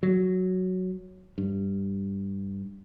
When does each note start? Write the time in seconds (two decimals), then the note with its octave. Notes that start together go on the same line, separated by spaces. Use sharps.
0.03 F#3
1.38 G2